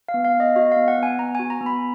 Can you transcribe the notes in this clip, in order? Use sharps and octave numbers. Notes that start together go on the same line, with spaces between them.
F5
B3
F5
B3
D#5
F#4 D#5
F5
B3
F#5
B3 G#5
B3 A#5
G#5
F#4
A#5
B3
B5